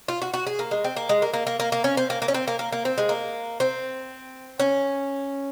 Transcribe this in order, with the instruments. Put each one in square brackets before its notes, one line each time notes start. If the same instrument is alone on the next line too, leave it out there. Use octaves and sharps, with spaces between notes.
[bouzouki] F4
F#4
F#4
G#4
A#3
G#3
C4
A#3
G#3
A#3
A#3
A#3
A#3
A#3
C#4
C4
A#3
A#3
C#4
C4
A#3
A#3
A#3
C4
G#3
A#3
C4
C#4